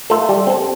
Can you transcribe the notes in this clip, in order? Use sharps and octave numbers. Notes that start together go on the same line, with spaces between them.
A3 F4 A4
G3
C4 A4